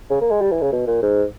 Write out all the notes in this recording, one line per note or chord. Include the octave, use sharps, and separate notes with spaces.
C#3
A#3
G#3
G3
E3
C#3
B2
A#2
G#2